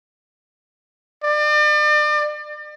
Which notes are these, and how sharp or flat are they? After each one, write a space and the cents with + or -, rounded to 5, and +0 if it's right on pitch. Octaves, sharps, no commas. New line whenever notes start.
D5 +35